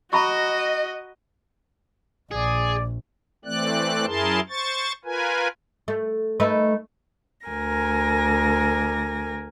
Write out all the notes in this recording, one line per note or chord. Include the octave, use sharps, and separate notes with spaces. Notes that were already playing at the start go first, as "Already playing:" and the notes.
F#4 D#5 A#5 B5 C#6
A#1 G#4 D5
E3 A3 C4 D5 F#6
F#2 E4 G#4 A#4 A5 C6
C5 C#6 A6
F4 A#4 B4 G#5
A3
A3 D#4 B4
D2 A#4 G#5 A#6